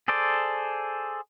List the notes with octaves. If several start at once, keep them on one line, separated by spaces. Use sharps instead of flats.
G#4 A4 C5 D5